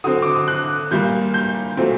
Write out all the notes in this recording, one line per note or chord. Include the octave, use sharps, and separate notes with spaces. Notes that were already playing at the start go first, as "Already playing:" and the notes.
D3 F#3 C4 D#6
D6
D#6
F#6
A#2 G3 A#3 G6
G6
A#2 F#3 A3 C4